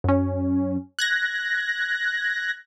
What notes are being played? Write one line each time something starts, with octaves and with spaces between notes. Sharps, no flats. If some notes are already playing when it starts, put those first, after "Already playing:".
F#2 C#4
F#6 G#6 A#6